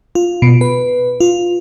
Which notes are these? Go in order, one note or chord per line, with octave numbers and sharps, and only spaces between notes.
F4
B2
B4
F4